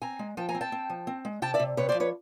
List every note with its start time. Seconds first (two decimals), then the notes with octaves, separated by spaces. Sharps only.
0.02 C4 G#5 A#5
0.19 G#3
0.37 F3 G5 A5
0.49 G#5 A#5
0.54 C4
0.61 G5 A5
0.72 C4
0.90 F3
1.07 C4
1.25 G#3
1.42 C3 G5 A5
1.54 D5 E5
1.59 C3
1.77 C3 B4 C#5
1.89 C5 D5
1.94 F3
2.00 B4 C#5